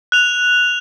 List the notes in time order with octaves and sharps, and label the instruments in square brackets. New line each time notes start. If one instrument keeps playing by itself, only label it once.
[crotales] F#6 F7